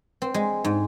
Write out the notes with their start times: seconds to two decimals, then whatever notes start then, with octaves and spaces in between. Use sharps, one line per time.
0.22 C4
0.34 G#3
0.64 G#2